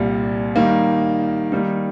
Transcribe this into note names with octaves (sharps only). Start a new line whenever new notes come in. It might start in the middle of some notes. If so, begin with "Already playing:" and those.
Already playing: C2 A#2 G3
D#3 G3 A#3 D#4
D#3 G3 A#3 D#4